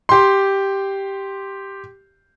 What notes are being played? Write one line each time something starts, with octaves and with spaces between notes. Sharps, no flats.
G4 C6